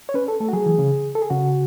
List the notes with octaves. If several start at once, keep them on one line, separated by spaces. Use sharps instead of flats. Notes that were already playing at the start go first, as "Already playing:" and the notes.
C#5
C#4 B4
A4
A3 A4
F#4
F#3 G#4
E3
C#3
A4
G#4
C#3 F#4